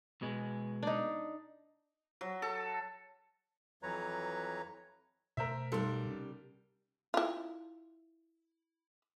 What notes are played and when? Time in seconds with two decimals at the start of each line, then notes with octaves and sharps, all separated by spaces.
0.22 B2 G#3
0.83 D4 D#4
2.21 F#3
2.42 A4
3.83 F2 E3 F#3 B4 C#5 A#5
5.37 B2 A3 A#4 C5 E5
5.72 B1 G3 A4 A#4 C6
6.05 C3 C#4
7.14 E4 F4